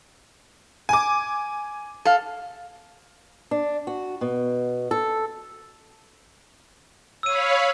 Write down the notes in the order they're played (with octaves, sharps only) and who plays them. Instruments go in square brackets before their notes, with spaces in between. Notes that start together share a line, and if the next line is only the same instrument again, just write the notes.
[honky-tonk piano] G#5 D6
[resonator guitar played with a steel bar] A4 F5
[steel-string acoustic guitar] D4
F#4
B2
A4
[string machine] C#5 F5 B5 [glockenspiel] E6 D#7